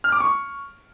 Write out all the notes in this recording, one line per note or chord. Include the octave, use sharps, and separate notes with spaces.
F6
D6
C#6